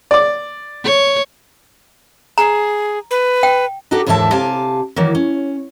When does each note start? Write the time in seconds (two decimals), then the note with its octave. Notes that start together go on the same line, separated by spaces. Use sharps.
0.11 D5 D6
0.84 C#5
2.38 G#4 A#5
3.11 B4
3.43 G5
3.91 D4 D#4 F#4 G4 A4
4.06 D#2 G#2 D3 E3 E5 A5
4.32 C3 G4 F5 G#5 A5
4.96 D#3 E3 F#3 A#3
5.15 C#4